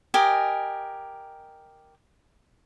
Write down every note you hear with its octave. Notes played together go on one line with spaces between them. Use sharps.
G4 A#4 D#5 G#5